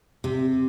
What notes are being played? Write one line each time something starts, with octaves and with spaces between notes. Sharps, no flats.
C3